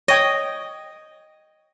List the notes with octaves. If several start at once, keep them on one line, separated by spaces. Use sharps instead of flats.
C#5 D#5 G5 D#6